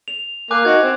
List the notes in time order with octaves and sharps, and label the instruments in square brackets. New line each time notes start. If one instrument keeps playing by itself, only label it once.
[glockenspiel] F7
[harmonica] A#3 [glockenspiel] G#5 D6 F#6
[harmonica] D#4 F#4 [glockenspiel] G#6
[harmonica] C4